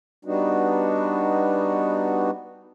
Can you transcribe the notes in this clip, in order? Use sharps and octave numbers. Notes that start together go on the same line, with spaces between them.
G3 B3 D4 D#4 F#4